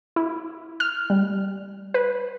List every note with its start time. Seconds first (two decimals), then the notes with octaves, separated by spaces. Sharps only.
0.16 E4
0.80 F6
1.10 G3
1.94 B4